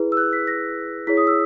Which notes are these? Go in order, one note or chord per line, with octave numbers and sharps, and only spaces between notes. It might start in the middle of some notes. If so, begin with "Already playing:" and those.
Already playing: E4 G#4 B4
E6
F#6
B6
A#6
E4 G#4 C#5 B6
D#6
E6